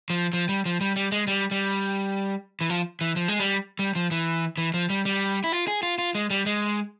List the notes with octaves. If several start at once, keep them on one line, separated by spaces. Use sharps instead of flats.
F3
F3
G3
F3
G3
G3
G#3
G3
G3
E3
F3
E3
F3
G#3
G3
G3
F3
E3
E3
F3
G3
G3
E4
F4
G#4
F4
F4
G#3
G3
G#3